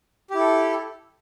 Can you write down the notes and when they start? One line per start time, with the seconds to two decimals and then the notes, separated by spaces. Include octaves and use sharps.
0.30 G4
0.35 E4
0.39 A4